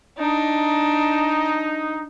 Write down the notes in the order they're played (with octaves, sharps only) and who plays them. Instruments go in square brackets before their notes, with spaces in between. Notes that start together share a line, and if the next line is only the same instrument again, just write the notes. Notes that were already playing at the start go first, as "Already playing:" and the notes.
[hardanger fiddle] D4 [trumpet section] D#4